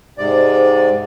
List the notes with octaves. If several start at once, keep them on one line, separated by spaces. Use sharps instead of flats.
G#2 C3 D5